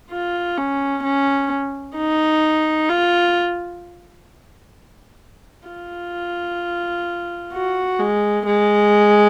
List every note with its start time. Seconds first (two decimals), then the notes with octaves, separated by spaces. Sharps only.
0.11 F4
0.57 C#4
1.04 C#4
1.96 D#4
2.89 F4
5.68 F4
7.54 F#4
8.00 G#3
8.46 G#3